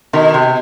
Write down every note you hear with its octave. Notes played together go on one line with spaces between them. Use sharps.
B2 D#3
C3